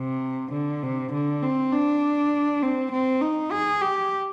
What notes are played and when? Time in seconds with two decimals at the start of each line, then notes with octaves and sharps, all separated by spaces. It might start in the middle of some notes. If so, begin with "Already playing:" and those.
Already playing: C3
0.52 D3
0.83 C3
1.13 D3
1.43 C4
1.73 D4
2.63 C4
2.92 C4
3.22 D#4
3.52 G#4
3.82 G4